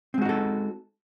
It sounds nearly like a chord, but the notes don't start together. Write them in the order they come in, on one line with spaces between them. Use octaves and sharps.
C4 G#3 F#4 D#4 A4